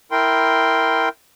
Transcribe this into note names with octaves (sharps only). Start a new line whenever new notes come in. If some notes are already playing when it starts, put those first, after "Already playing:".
E4 A#4 G5 C6